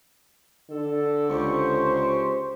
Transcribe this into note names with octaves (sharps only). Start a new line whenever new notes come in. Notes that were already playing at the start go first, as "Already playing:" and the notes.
D3 A4
C#2 G4 C5 C#6